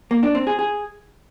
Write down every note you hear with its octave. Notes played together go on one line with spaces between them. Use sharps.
A#3
D4
C4
G#4
G#4